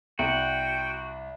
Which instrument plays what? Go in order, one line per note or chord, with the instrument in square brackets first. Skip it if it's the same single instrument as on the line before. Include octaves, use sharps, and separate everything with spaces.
[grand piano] C2 [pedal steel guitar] F#4 [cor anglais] G5